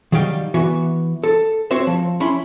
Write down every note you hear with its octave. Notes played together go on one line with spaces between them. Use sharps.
D#3 F#3 G3 F5 G5
E3 B3 F#4
A4
C4 F#4 C5 C#5 E5
F3
C#4 E4 B5 C6